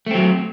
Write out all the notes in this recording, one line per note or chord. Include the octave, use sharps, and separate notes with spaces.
F#3 A3 C4